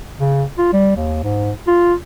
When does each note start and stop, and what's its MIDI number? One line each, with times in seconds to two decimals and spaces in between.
0.20 0.44 49
0.58 0.71 65
0.73 0.93 55
0.96 1.19 39
1.24 1.52 44
1.67 1.94 65